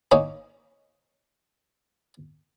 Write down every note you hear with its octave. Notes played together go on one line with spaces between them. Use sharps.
A#3 C#4 D#4 C#5